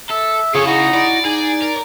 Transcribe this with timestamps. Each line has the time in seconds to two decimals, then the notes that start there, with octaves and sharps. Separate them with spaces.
0.10 A4 E5
0.55 C#3 F4 G#4 A4 C#5
0.67 D#4 E4 F#4
0.94 E4 D5
1.25 D#4 G#4 G#5
1.62 A#4